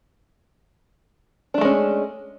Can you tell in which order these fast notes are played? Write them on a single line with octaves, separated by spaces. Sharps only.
D4 A3 G#3 C#4